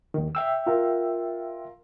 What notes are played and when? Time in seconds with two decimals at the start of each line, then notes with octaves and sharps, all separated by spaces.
0.14 D#2 D#3
0.35 E5 G5 E6
0.66 F4 A#4